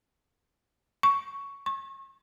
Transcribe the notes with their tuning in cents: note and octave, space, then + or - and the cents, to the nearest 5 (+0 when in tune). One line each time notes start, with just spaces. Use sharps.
C#6 +10
C#6 -35